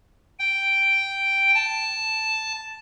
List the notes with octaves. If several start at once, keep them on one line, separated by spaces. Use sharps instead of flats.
G5
A5